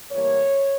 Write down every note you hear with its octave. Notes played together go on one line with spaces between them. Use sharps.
A2 E3 G3 A#3 C#5